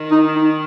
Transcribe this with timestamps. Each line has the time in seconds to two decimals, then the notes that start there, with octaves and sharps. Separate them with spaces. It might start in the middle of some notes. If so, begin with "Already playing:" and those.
Already playing: D#3
0.11 D#4
0.36 D#4